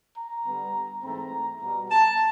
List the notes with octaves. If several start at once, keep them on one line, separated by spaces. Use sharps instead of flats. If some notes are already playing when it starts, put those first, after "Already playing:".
A#5
D3 G3 B3
G#2 E3 A3 C4 A#5
B2 G3 B3
A5